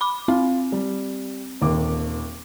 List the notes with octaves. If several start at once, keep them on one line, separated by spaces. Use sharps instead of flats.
B5 D6
C4 F4
G3
D#1 D#2 D6